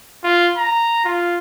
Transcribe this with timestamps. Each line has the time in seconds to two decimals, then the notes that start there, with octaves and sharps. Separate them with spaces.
0.24 F4
0.57 A#5
1.05 F4